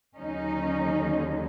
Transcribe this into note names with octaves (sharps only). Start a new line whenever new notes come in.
D#2 D3 F#3 C#4 D#4